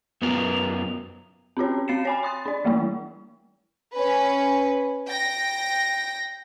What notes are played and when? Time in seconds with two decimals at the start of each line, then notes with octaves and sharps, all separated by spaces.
0.22 F#2 B3 F4 A#4
1.57 C4 C#4 F4 C#5
1.88 C4 F5 A6 C7 C#7 E7
2.05 C#5 G#5 B5
2.23 C6 D#6 A6
2.46 D4 D5
2.65 E3 G3 A3 A#3 E4
3.94 C#4 B4
5.07 G5 A#6